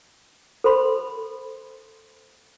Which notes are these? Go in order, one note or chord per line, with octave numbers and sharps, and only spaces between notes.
A4 C5 B5 C6